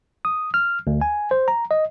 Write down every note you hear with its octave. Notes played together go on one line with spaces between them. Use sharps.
D#6
F6
D2
G#5
C5
A#5
D#5